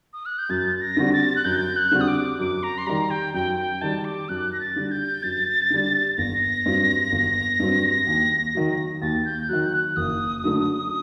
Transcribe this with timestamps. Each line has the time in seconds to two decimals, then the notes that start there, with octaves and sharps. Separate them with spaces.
0.13 D#6
0.26 F#6
0.38 G6
0.49 F#2 A6
0.81 A#6
0.97 D3 G3 C4 F#4
1.13 A6
1.36 F#6
1.45 F#2 G6
1.76 F#6
1.91 D3 G3 C4 F#4
2.01 D#6
2.08 D6
2.39 F#2 D6
2.63 A#5
2.78 C6
2.87 D#3 G3 A#5
3.10 G5
3.34 F#2 G5
3.58 G5
3.82 D#3 G3 A5
4.05 D6
4.29 F#2 F#6
4.53 A#6
4.60 A6
4.76 D3 G3
4.91 G6
5.23 F#2 A6
5.70 D3 G3
6.18 G1 A#6
6.66 G2 F#3 C4
7.12 G1
7.60 G2 F#3 C4
8.07 D#2
8.55 D#3 F#3
9.02 D#2 A6
9.25 G6
9.49 D#3 F#3 F#6
9.72 F#6
9.96 F#1 D#6
10.44 F#2 D3 A3